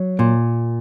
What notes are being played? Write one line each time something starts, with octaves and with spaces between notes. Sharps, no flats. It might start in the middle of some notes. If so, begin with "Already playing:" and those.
Already playing: F#3
A#2